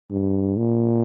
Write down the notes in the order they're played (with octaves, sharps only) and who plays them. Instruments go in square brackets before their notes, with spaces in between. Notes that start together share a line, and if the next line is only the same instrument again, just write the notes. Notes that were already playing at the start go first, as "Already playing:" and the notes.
[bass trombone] G2
A#2